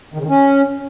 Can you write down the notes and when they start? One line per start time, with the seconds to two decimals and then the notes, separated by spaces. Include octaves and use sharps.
0.14 D#3
0.19 C#3
0.24 D#3
0.29 C#4